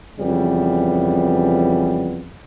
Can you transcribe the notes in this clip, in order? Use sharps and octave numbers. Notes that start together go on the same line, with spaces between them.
F2 C#3 E3 G3 B3